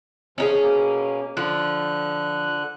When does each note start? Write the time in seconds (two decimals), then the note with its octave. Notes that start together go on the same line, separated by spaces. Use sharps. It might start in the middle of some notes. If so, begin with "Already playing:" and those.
0.38 C3 F3 C#4 D#4 G#4
0.63 B2 A#3
1.37 D3 F3 F#6